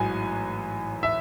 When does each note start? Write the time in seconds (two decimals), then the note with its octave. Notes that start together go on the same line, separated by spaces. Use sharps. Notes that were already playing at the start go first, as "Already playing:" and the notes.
Already playing: A1 G#2 F#3 G#5
1.03 E5